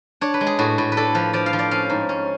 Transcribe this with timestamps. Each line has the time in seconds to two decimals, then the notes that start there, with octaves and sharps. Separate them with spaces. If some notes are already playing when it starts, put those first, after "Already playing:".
0.21 D4 C#5
0.34 B4
0.41 G#3
0.47 G#4
0.59 A2 F#4
0.78 A2
0.92 B4
0.97 D4 A4
1.15 F3 B4
1.33 F3 D5
1.46 F5
1.53 F3
1.59 D5
1.71 C#4 F5
1.90 G#2
2.09 C#4